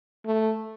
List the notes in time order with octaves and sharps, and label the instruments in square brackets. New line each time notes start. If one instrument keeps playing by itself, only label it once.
[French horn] A3